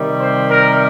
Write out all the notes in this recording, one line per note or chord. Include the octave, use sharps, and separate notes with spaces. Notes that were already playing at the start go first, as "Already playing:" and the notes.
Already playing: C3 D#3 G3
C5
A#4